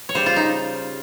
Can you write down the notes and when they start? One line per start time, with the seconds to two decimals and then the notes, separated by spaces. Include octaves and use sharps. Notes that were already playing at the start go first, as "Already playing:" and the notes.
0.09 C#5
0.15 C#3 G3 C5
0.26 F4
0.36 D#4